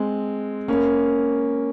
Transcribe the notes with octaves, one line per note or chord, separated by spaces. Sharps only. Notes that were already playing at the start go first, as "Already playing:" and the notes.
Already playing: G#3 C4
A#3 C#4